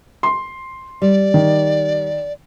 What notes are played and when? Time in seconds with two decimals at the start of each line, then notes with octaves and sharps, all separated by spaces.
0.23 C6
1.02 G3 D5
1.34 D#3